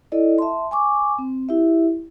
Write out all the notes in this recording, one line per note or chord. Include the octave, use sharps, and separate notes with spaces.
E4 A4 D5 D#5
E5 A5 C6
G#5 C#6 D6
C4
E4 G4 E5